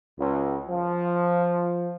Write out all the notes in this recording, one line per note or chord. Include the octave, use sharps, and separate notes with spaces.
C#2
F3